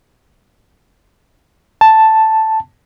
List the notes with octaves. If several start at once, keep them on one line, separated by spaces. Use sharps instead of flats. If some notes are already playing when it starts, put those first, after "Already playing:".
A5